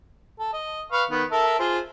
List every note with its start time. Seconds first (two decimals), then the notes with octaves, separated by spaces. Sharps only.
0.40 A4
0.53 D#5
0.92 B4 F5 C#6
1.11 D#3 B3
1.32 A4 A#4 E5
1.60 F4 G#4 C5